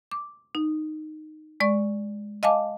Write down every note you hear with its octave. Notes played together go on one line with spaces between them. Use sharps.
D6
D#4
G#3 D5 C#6
D#5 F5 G#5 A5 D6